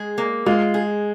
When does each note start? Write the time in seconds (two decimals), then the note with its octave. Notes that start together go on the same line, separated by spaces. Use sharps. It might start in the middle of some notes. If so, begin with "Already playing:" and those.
Already playing: G#3 G#4
0.18 A#3
0.46 G#3 F4
0.74 G#4